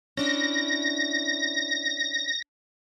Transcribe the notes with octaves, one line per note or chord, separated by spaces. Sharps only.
C#4 D4 E4 A#6